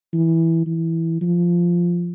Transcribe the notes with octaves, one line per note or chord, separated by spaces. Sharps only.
E3
E3
F3